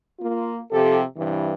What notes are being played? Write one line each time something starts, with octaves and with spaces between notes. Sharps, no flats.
A#3 F4
C3 F3 G4 A4
G2 C3 E3